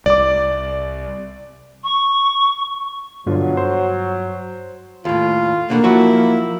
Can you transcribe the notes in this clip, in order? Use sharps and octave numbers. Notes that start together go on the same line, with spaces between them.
C2 D5 D6
C#6
G2 B2 D3 F#3 F4
C5 C6
D#2 A2 F4
E2 B2 D3 A#3
F3 F#3 E4 F#4